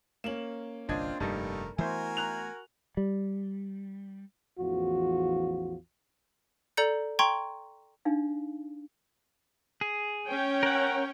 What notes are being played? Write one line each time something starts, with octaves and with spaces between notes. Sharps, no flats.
A#3 C#4 E7 F#7
G1 C2 C4 D4 F4 C5 D#5 G#6
F1 G2 A#2 G3 A3 D#4 A#4
E3 A3 B3 E4 F#4 A#4 C5 G#5
A#5 F#6 F7
G3
A1 E2 F3 F4 F#4
A4 D5 A#5 G6 C#7
G5 A#5 C6 C#6 G#6
D4 D#4 F5
G#4
C#4 C#5 G5
A#4 F#5